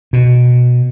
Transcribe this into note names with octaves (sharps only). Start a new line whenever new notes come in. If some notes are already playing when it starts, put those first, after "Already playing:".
B2